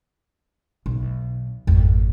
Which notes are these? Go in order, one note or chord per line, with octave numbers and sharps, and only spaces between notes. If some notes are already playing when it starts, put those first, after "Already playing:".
B1
G#1 F2